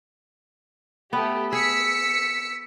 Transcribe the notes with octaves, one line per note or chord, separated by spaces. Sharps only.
A3 B3 G4
G#4 E6 B6 C#7